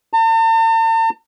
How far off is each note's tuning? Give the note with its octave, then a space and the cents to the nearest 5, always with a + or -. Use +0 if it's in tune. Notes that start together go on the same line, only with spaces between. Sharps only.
A5 +45